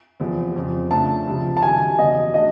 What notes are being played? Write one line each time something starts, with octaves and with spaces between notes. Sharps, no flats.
E2 C3 F3
F2 C#3 F3
C#3 F3 A3 D4 A5
C#2 C3 F3
A5
F#2 D#3 G3 G#5
E2 C#3 F#3 D#5
F#3 A3 D4 D#5